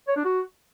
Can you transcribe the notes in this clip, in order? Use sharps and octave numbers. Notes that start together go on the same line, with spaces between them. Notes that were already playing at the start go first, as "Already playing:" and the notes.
C#5
D4
F#4